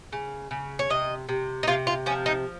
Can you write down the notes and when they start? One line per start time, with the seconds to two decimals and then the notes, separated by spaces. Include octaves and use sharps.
0.12 C#3
0.51 C#3
0.79 C#5
0.90 C3 D#5
1.29 C3
1.63 D#4
1.67 C3 F4
1.87 F4
2.06 F3 C#4
2.26 D#4